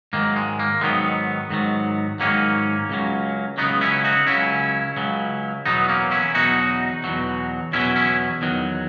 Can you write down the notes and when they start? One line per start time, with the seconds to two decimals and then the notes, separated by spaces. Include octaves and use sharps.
0.13 G#2 D#3 F#3 A#3
0.36 G#3
0.60 A#3
0.81 G#2 D#3 F#3 G#3 B3
1.50 G#2 D#3 F#3
2.20 G#2 D#3 F#3 A#3 C#4
2.90 C#2 C#3 F#3
3.58 C#2 C#3 F#3 B3 D#4
3.81 C#4 E4
4.04 D#4 F#4
4.27 C#2 C#3 F#3 C#4 E4
4.97 C#2 C#3 F#3
5.66 E2 B2 F#3 B3 D#4
5.89 A#3 C#4
6.11 C#4 E4
6.35 E2 B2 F#3 D#4 F#4
7.04 E2 B2 F#3
7.73 E2 B2 F#3 C#4 E4
7.96 C#4 E4
8.42 E2 D#3 F#3